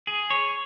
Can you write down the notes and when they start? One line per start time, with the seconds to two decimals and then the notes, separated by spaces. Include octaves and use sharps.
0.07 G#4
0.30 C#5